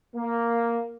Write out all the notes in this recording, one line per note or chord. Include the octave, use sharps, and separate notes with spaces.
A#3